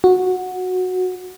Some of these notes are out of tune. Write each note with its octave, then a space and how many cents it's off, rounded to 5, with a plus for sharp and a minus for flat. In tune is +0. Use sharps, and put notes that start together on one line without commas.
F#4 -10